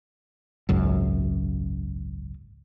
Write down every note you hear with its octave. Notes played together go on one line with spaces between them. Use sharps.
G#1 C#2 F#2